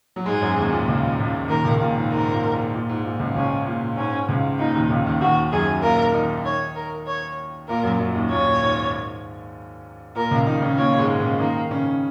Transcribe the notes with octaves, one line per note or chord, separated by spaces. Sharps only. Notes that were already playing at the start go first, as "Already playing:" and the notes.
F#3
G#2 G#3 G#4
F#2 F#3
D#2 D#3
A#2
C#2 C#3
C#2 C#3
D#2 D#3 A#4
C#2 C#3
A#2
G#2
G#2 A#4
A#2
A#2
A#2
G#2
A#2
C#2 C#3
C#2 C#3 C#4
A#2
G#2 C#4
C#2 C#3
A#2 D#4
D#2 D#3
C#2 C#3
D#2 D#3
D#2 D#3 F#4
F#2 F#3 G#4
A#2 A#3 A#4
D#3 D#4
C#5
A#4
C#5
A#2 A#3 A#4
F#2 F#3
F#2 F#3
D#2 D#3
A#2 C#5
G#2
A#2 A#4
C#2 C#3
D#3 D#4
C#3 C#4
A#2 A#3 C#5
G#2 G#3
C#3 C#4
D#3 A#3 D#4
C#3 C#4